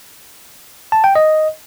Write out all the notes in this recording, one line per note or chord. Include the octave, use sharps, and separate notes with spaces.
A5
G5
D#5